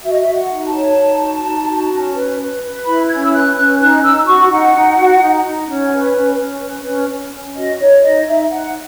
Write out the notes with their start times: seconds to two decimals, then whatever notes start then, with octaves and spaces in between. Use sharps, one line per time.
0.03 F#4 E5
0.12 D#5
0.21 E5
0.27 F#4
0.34 F#5
0.50 D#4
0.66 A5
0.74 C#5
0.97 D#4
1.20 F#4
1.44 D#4
1.67 F#4
1.91 C#4
2.15 B4
2.38 B4
2.62 B4
2.85 E4 B5
3.09 C#4 G#6
3.24 E6
3.32 B4 F#6
3.56 C#4 F#6
3.79 D#4 F#6
4.03 D#4 E6
4.26 F#4 C#6
4.50 D#4 F#5
4.73 D#4
4.97 F#4
5.20 D#4
5.44 D#4
5.68 C#4
5.91 B4
6.14 C#4
6.38 C#4
6.61 B4
6.85 C#4
7.09 C#4
7.32 C#4
7.55 F#4 D#5
7.79 D#4 C#5
8.03 D#4 D#5
8.26 D#4 E5
8.50 D#4 F#5